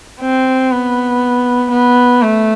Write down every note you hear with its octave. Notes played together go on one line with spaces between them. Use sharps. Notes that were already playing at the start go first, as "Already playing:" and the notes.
C4
B3
B3
A3